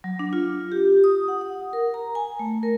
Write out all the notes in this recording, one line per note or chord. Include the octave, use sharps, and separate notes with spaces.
F#3
D4
F4
G4
D#6
F#5
F#5
A#4
A#5
G#5
A3
A#4